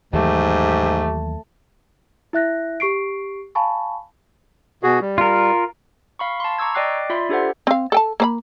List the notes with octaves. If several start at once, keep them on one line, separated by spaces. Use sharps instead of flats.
D#2 G#2 E3 F#3 A3 G4
E4 E5 F#6 A#6
G4 C#6 C7 D7
F5 G#5 A5 B5 C#6
B2 F#4 G#4
G3
F4 A#4
F5 B5 C#6
A5 C6
A#5 C#6 D6 E6 G#6
D5 D#5 G5 D6 F#6 C7
F4 D5 E5 B5 C6
D4 G4 A4 C5 F#5
C4 F5
A4 G5 A5
A#3 C5 B5